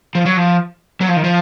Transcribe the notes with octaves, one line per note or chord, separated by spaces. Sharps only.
F3
F#3
F3
F#3
F3
D#3
F3